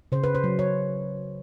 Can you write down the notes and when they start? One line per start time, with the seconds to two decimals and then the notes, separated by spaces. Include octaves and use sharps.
0.12 C#3 C5
0.24 B4
0.35 C5
0.44 F#3
0.59 C#5